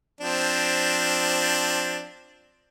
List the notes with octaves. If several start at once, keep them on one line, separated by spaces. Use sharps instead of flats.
F3 C4 D4